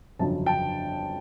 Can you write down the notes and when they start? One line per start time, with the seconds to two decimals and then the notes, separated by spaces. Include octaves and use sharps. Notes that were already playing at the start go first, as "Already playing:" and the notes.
0.19 G1 F2 C#3 F#3 A5
0.46 G5 A5